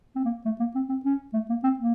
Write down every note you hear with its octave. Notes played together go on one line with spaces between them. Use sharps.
C4
A#3
A3
A#3
C4
C4
C#4
A3
A#3
C4
A#3